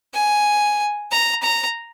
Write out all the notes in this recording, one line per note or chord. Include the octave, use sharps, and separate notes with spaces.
G#5
A#5
A#5